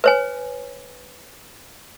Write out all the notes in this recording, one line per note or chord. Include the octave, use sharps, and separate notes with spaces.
B4 C#5 G#5